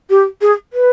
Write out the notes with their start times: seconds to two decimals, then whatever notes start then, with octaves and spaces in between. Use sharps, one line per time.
0.10 G4
0.41 G#4
0.73 B4